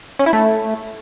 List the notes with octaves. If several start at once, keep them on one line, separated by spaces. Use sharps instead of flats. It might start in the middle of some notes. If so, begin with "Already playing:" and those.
C#4
E4
A3